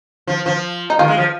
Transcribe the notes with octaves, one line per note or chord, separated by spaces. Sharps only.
F3
F3
D#4
D#3 F4
G#3
F3